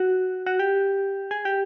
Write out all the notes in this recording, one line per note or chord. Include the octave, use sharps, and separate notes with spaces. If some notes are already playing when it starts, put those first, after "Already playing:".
Already playing: F#4
F#4
G4
G#4
G4